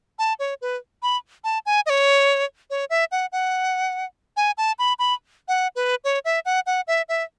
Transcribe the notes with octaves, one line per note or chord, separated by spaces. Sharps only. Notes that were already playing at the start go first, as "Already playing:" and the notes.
A5
C#5
B4
B5
A5
G#5
D#5
C#5
C#5
E5
F#5
F#5
G#5
A5
B5
B5
F#5
B4
C#5
E5
F#5
F#5
E5
E5